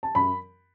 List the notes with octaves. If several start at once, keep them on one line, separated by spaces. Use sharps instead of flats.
A5
F#2 B5